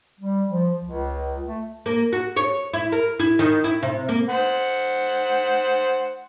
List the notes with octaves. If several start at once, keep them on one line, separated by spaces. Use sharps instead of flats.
G3
F3
C#2
A3
A#3
F#4
C#5
E4
A#4
E4
D#3
E4
C3
A#3
C5 F#5